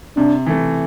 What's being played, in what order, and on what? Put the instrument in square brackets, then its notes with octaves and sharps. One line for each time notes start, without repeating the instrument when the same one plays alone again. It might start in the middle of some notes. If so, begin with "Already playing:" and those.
[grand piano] C3 [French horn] D4
[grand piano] E3 A3